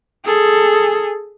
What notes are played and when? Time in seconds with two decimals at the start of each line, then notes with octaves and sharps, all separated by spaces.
0.25 G#4 A4